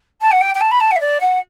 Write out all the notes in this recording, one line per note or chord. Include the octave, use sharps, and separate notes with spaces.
A5
F#5
G5
G5
A5
B5
A5
F#5
E5
D5
F#5